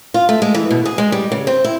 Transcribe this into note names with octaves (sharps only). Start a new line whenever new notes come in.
F4
A3
G#3
E3
B2
G#4
G#3
G3
C#3
C4
E4